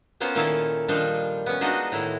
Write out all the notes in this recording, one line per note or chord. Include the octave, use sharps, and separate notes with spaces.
A#3 B3 C#4 F4 C5
A#2 D#3 A#3 E4 A4
D#3 F3 G3 D4 D#4
B3 C#4
G#3 D4 D#4 F4 F#4 D#5
A2 D#3 E4